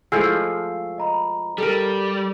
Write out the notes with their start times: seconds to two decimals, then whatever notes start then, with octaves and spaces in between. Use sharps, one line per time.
0.12 F3 G#3 A3 E4 G#5 E6 C7
0.98 D#5 A#5 B5
1.58 G3 A4 A#4